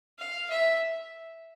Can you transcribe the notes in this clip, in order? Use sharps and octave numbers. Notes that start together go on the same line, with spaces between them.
F5
E5